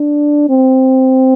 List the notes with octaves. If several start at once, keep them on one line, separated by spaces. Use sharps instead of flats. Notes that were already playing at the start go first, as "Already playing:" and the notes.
Already playing: D4
C4